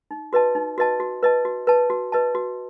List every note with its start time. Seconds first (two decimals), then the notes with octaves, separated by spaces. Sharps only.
0.11 D#4
0.33 F#4 B4 D#5 A5
0.55 D#4
0.78 F#4 B4 D#5 A5
1.00 F#4
1.23 B4 D#5 A5
1.45 F#4
1.67 B4 D#5 A5
1.90 F#4
2.12 B4 D#5 A5
2.35 F#4